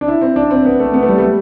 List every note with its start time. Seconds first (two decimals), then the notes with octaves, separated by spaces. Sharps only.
0.01 D4
0.08 E4
0.21 C4
0.36 D4
0.51 C4
0.65 B3
0.80 A3
0.94 B3
1.03 A3
1.08 G3
1.18 A3
1.23 G3